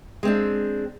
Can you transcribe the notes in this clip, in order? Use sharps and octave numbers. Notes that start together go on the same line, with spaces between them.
G#3 C4 D4